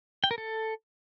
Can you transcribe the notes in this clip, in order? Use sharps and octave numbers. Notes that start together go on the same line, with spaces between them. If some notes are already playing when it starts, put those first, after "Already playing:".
G5
A#4
A4